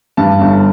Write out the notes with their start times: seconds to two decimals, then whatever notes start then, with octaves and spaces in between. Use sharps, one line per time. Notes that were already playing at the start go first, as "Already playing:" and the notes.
0.17 G2 A5
0.41 G1